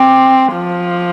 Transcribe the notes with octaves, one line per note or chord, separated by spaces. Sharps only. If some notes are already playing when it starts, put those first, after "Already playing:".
Already playing: C4 D6
F3